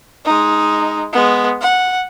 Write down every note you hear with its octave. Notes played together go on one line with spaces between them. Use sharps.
G#3 D#4
G#3 B3
F#5